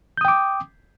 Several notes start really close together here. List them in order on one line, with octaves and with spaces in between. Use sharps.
G6 D#6 G5 D6